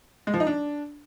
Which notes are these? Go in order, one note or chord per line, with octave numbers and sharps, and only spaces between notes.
G#3
F3
D#4
D4